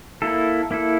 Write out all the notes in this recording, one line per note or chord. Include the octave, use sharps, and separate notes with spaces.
A#3 E4 A4
A#3 E4 A4